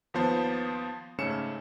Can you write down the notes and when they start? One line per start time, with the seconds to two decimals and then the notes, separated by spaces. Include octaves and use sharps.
0.14 D#2 F3 B3 C5 A5 C7
1.18 G#2 C#3 A3 C#4 C#7 E7